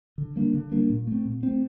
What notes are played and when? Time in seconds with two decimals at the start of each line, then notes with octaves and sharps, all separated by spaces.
0.18 D3
0.36 G3 A#3 D4
0.54 D3
0.72 G3 A#3 D4
0.90 A#2
1.07 A3 C4
1.25 A#2
1.43 A3 C4